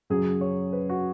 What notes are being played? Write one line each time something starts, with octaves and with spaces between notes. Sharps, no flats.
F#2 C#3 F#3 G#4
C#5
B4
F#4